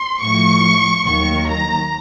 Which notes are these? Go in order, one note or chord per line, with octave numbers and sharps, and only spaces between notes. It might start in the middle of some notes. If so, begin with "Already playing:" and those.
Already playing: C6
A2 F3 C#6
D#2 D#3 F#3 C#6
A#5